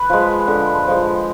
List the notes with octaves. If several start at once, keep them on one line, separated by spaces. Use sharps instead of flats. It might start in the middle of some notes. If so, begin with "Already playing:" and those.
Already playing: B4
F3 G#3
D3
F3 G#3